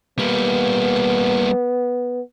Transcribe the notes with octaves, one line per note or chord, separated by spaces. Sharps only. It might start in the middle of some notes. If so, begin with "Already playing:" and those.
G3 A#3 B3